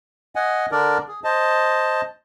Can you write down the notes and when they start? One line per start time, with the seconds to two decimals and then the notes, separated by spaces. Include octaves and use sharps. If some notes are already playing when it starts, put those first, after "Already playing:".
0.35 D#5 F#5 G#5
0.71 D3 D4 A#4 D5
1.08 G#4
1.24 C5 D#5 A5